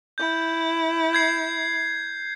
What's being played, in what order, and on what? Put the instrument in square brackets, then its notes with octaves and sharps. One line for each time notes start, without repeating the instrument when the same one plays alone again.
[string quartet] E4 [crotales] G6
[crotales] G6 G#6 C7